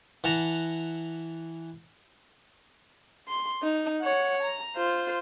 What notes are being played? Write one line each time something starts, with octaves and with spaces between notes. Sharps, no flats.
E3 F#5 A5 A#5
C6
D#4
C#5 F#5
A#5
F4 C5